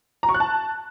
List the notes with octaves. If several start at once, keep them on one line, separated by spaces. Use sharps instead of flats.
A#5
C#6
F#6
A5